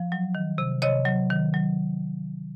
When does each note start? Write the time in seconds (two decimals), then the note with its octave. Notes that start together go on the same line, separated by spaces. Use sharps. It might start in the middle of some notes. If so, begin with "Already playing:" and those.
Already playing: F3
0.12 F#3
0.35 D#3
0.58 C3
0.82 C3 C#5 D#5
1.05 F#3
1.30 D#3
1.54 F#3